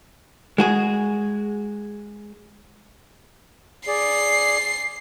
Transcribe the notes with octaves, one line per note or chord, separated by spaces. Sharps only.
G#3 F#4 G#4
G#4 D5 C7